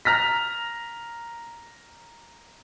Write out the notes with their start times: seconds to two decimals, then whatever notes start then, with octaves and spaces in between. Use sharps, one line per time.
0.05 A#5 F6 A#6 B6